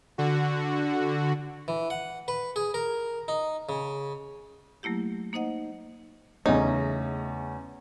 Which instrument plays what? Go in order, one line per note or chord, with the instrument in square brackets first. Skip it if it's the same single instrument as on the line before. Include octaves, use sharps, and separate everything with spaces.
[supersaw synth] D3 F#4
[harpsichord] E3
F#5
B4
G#4
A#4
D#4
C#3
[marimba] F#3 A3 A#3 E4 G4
A#3 D#4 C5 D#5 F#5
[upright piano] E2 C#4 [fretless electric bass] C#3 A3 [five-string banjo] D#4